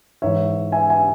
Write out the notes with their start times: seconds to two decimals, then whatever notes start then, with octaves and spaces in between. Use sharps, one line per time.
0.22 G#2 E3 C#5 E5
0.72 E5 G#5
0.89 E5 G#5